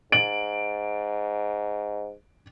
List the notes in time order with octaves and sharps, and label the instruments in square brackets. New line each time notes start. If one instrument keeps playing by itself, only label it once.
[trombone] G#2 [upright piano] D7 F#7